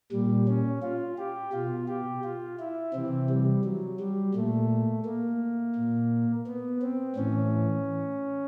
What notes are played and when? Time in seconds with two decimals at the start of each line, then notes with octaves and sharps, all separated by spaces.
0.11 A#2 G3
0.48 C#4
0.82 F4
1.18 G4
1.53 B2 F4
1.88 G4
2.24 F4
2.59 E4
2.93 C3 E3 C4
3.29 G3
3.64 F#3
4.00 G3
4.34 A#2 A3
5.05 A#3
5.75 A#2
6.46 B3
6.82 C4
7.16 A2 E3 C#4